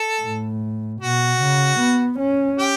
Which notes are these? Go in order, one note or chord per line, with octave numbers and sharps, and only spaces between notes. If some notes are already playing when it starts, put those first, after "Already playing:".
Already playing: A4
A2
B2 F#4
C#3
B3
C#4
G4